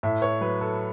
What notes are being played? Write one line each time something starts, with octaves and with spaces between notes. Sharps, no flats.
A2 E5
C#5
F#3 B4
A4